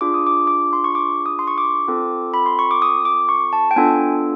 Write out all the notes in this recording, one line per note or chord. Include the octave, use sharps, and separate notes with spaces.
D4 F4 G#4 D6
D#6
D6
D6
C6
C#6
D6
D#6
C6
C#6
D6
C4 F4 A4
B5
C6
C#6
D6
D#6
D6
C#6
A5
G5
B3 D4 F4 A4 G#5